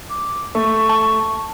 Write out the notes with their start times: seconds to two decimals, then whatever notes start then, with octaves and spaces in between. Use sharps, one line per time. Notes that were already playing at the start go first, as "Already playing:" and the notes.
0.10 D6
0.55 A3 C#6
0.89 A5